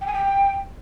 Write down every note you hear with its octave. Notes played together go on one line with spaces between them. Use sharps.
G5
G#5
G5